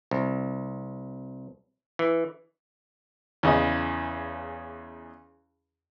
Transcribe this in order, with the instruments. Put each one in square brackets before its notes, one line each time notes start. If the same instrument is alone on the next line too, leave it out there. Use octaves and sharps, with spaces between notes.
[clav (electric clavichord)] C2
E3
[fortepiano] E2 C#3 D#5